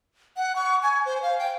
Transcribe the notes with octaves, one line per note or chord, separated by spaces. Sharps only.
F#5
C#6
G#5
C5
F5
G5